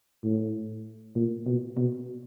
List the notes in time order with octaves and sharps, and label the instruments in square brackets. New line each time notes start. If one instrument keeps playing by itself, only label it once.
[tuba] A2
A#2
B2
B2